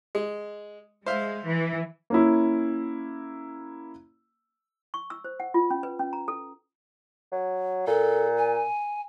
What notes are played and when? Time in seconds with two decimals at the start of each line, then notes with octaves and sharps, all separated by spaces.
0.15 G#3
1.06 G#3 C5 E5 F5
1.46 E3
2.10 A#3 C#4 E4
4.94 C#6
5.10 E6
5.24 C5
5.40 F#5
5.54 F4
5.70 C#4
5.83 B4
5.99 C#4
6.13 A#5
6.28 A4
7.32 F#3
7.87 A#2 A4
8.37 G#5